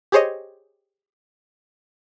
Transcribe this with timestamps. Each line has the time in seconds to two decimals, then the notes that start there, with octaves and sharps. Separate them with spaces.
0.12 G4 G#4 C5 C#5 D#5